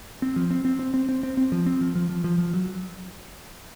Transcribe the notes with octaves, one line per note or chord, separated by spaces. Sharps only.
C4
F3
C4
C4
C4
C4
C4
C4
C4
F3
C4
F3
F3
F3
F3
F3
F#3